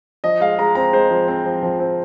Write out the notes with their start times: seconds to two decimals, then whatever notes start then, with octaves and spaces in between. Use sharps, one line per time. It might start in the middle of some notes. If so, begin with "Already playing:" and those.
0.24 F3 D#5
0.40 G#3 F5
0.58 G#3 A#5
0.75 C4 A#5
0.93 G#3 C5
1.11 F3
1.28 C4
1.46 F3
1.63 F3
1.80 C4